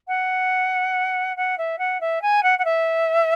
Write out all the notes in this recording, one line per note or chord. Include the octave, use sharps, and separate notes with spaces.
F#5
F#5
E5
F#5
E5
G#5
F#5
F#5
E5